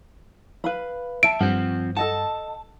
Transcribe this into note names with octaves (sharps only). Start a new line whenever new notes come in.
B4 F5 B5
E5 A5 D7
G2 F3 C4 F#5
A4 D#5 F#5 A5